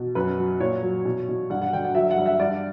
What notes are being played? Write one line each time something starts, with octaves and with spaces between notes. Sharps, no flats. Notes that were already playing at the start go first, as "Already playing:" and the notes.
Already playing: B2
F#2 B4
F#3
A#2 C#5
F#3
B2
B2
G2 F#5
F#5
D3 G5
F#5
F#3 E5
F#5
G2
E5
G2 D5